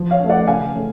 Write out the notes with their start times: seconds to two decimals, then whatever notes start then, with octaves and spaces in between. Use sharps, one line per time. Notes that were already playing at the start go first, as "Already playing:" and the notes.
Already playing: F3
0.11 C#5 F5
0.20 A3 C#4
0.29 D5 F#5
0.47 C#3 F5 G#5
0.75 A3 C#4